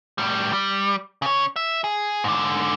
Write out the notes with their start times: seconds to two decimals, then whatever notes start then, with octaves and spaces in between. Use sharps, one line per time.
0.18 A2 G3
0.53 G3
1.22 C#3 C#5
1.56 E5
1.84 G#4
2.24 G#2 D3